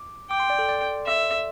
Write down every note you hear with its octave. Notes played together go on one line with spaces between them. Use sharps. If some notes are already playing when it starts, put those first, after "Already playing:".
Already playing: D6
G5 D6
C6
D5
A4
D5
E5